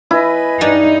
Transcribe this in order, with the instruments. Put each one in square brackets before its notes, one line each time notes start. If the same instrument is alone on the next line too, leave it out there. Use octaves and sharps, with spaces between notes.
[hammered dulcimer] E4 [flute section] B4 D#5 G#5
[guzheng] G2 D4 [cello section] D#4